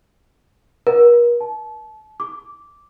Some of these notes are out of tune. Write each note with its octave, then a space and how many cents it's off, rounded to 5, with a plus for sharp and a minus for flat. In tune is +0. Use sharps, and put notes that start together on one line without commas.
A#4 +40
A5 -30
D6 -10